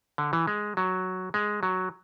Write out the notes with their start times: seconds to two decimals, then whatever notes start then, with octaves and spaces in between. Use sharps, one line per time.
0.18 D3
0.33 E3
0.47 G#3
0.77 F#3
1.34 G#3
1.63 F#3